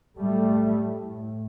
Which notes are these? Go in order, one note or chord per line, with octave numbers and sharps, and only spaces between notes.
A2 G3 A3